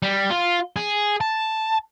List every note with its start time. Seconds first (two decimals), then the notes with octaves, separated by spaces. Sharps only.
0.02 G3
0.30 F4
0.76 G#4
1.21 A5